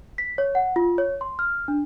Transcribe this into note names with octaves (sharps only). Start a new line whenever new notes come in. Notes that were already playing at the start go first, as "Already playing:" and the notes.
B6
C#5
F#5
F4
C#5
C6
F6
D4